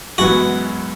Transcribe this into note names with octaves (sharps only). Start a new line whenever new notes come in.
F#2 E3 G#3 B3 F#4